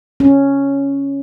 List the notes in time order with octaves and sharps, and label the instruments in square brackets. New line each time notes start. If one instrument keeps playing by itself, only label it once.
[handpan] C#4